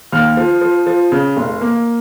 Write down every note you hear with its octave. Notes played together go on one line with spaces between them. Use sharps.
D#2 F6
F3
F3
F3
C#3
F1
A#3